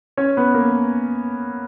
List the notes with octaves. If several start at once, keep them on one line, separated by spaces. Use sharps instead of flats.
C#4 C#5
B3 B4
A#3 A#4